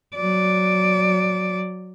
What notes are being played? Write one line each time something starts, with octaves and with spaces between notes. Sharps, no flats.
F#3 D5